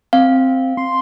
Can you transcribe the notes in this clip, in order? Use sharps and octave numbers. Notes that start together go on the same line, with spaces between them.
C4 F5
C6